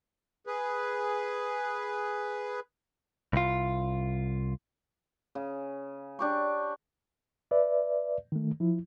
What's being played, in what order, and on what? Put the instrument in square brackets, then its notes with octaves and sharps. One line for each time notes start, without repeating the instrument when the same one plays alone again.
[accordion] G#4 B4
[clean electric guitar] C2 F4
[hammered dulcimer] C#3
D4 G4 C#6
[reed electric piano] B4 D5 E5
D#3 A3
F3 E4